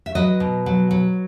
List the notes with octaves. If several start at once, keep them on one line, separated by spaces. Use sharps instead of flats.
E5
F#3 B4 D#5
B2
F#3
F#3